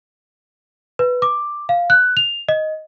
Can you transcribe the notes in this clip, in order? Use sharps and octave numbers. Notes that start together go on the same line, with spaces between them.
B4
D6
F5
F#6
F7
D#5